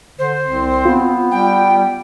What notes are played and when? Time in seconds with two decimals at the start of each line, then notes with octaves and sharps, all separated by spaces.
0.19 D3 C5
0.44 C2 C4
0.85 B3 F4
1.31 G3 G5